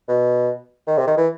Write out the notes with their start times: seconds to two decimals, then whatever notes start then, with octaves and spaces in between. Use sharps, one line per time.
0.09 B2
0.87 D#3
0.98 C3
1.07 D#3
1.17 E3